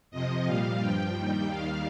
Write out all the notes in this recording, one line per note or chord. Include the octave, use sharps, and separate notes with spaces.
F2 C3 F3 D#5
A#2 G3 F5
G2 F3 G5
D#2 D#3 G3
D#2 D#3 G3 F5